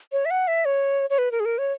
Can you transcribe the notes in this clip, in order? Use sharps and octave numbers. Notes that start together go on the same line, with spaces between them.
C#5
E5
F#5
E5
C#5
C#5
B4
A#4
G#4
A#4
C#5